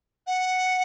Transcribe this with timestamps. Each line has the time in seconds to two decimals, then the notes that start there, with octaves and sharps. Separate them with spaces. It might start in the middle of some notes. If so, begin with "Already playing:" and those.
0.27 F#5